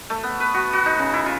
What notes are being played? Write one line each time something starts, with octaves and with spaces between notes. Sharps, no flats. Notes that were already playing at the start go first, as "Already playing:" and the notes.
A3
B3
B4
F#4
F#4
D#4
C#3
E4
F4